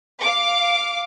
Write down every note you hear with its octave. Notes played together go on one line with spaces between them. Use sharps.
F5 D6